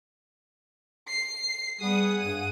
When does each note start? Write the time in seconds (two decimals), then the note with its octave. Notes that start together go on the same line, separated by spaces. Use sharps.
1.08 C7
1.81 G3 B3 G#4 F#5 D#6
2.19 G2 D#7